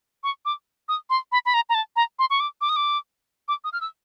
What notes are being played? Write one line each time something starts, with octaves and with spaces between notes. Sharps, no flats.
C#6
D6
D#6
C6
B5
B5
A#5
A#5
A5
A#5
C6
C#6
D6
D6
D#6
D6
D6
D#6
F6
E6